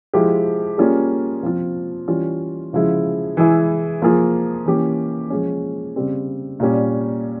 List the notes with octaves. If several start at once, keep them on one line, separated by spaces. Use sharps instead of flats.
F3 G#3 E4 G4
G3 A#3 C#4 F4 G#4
F3 C4 F4
E3 G3 C#4 F4
C#3 F3 G#3 E4
E3 G#3 E4 G#4
F3 A#3 F4 G#4
E3 A#3 C#4 G4
F3 G#3 C#4
C#3 G3 C4
A#2 G3 C#4